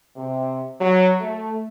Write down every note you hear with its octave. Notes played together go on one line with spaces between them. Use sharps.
C3
F#3
A3